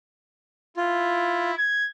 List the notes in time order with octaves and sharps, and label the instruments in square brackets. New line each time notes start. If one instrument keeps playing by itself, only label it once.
[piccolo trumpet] E4 [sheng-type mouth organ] F4
[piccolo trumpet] G#6